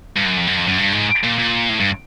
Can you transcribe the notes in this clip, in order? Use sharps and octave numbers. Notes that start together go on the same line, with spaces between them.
G2
F#2
F2
F#2
F2
F#2
G2
G#2
A#2
A#2
A2
G2